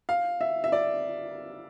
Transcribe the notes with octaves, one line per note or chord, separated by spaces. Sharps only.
F5
E5
E5
D5